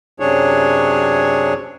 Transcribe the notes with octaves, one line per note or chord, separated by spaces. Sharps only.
F#2 C3 F#3 D4 G#4 C#5